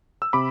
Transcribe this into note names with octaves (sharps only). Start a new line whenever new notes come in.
E6
C3 B5 D6